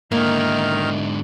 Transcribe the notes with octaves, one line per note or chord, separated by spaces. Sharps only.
G#2 D3 D#3 A#3 E4 D#5 F6